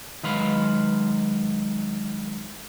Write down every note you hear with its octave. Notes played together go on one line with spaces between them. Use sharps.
D#3 F#3 G#3 B4 F5 B5